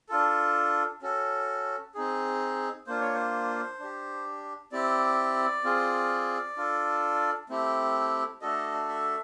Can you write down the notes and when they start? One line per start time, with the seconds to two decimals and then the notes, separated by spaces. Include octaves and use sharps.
0.09 D4 F4 A4
1.02 C#4 F#4 A4
1.95 C4 D#4 G#4
2.87 A#3 D4 F4 C5
3.01 C#5
3.14 C5
3.79 D4 G4
4.72 C4 E4 G4 D5
5.64 C4 F4 G#4
6.57 D4 F4 A4
7.49 A3 C4 E4 G4
8.41 A3 D4 F#4 A4 D#5
8.88 E5